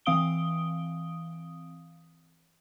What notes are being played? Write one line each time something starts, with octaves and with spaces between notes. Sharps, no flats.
E3 C4 F5 D#6 D7 G7